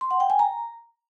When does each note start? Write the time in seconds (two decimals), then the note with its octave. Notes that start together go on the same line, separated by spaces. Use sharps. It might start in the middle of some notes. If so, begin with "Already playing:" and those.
0.01 C6
0.11 F#5
0.20 G5
0.30 G#5
0.39 A#5